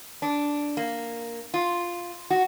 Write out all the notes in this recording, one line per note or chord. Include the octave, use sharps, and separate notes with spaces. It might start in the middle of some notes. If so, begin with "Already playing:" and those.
D4
A#3
F4
F#4